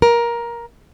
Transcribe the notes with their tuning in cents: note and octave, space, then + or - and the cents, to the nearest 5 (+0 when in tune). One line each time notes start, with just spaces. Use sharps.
A#4 +15